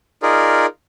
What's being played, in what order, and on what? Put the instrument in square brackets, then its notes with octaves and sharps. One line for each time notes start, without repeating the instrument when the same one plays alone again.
[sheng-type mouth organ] D#4 F4 G#4 A#4 D5